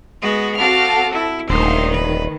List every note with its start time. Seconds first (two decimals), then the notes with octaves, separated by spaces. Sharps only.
0.22 G#3 B3 F#4
0.57 C4 F#4 A4 F5 D6 F6
1.12 E4
1.50 D#1 D2 D#3 D#4 C5
1.92 B4